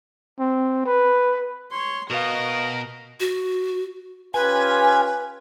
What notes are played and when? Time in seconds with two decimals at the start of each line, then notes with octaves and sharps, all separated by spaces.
0.39 C4
0.86 B4
1.72 C#5 C6
2.10 B2 F#4 A#4 B4 D#5 F5
3.20 F#4
4.34 C#4 F4 G4 B4 G#5